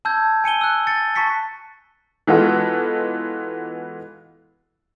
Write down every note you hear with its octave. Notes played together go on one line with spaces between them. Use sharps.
A5 E6 G6 G#6
G#5 C#7 D#7 G7
E6 F#6
A6 C#7
A5 A#5 C#6 A6 B6 C#7
E3 G#3 B3 F4 F#4 A4